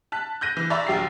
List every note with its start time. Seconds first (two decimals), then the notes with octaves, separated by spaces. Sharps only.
0.12 A5 F#6 B6
0.41 F#6 G6 A#6 D#7
0.57 E3
0.70 D5 E5 A#5 B5 C#6 E6
0.87 A#1 D#2 F#3 G4 A6 C7